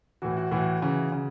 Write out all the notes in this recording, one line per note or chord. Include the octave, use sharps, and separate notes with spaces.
A2 E3 F#4
F#4
A2 E3 F#4
C#3 E3
C#3